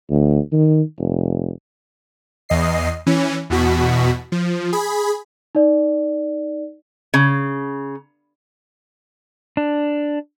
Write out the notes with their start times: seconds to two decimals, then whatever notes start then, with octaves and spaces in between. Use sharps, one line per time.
0.10 D2
0.53 D#3
0.98 F1
2.49 E2 D#5 C7
3.06 E3 C#4
3.50 E2 B2 F#4 B6
4.32 F3
4.73 G#4 B5
5.55 D#4 D5
7.14 C#3
9.57 D4